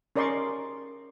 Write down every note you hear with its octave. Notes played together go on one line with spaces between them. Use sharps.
C#4 A#4 D5 D#5 C6 C#6